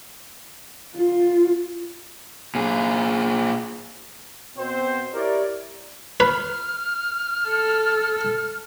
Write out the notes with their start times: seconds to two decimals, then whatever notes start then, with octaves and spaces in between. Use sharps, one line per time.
0.96 F4
2.55 A#2 G#4
4.57 B2 C4 C5
5.14 E4 G4 A#4 C#5 D5
6.20 B4 F6
7.48 A4